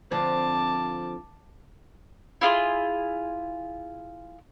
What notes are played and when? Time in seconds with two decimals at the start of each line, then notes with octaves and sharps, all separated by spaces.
0.11 D3 F3 C4 A5 D6
2.41 E4 F4 G#4 C6